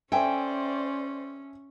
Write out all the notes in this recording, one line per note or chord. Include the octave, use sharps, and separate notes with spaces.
C#4 A4 C5 D5 E5 G5 G#5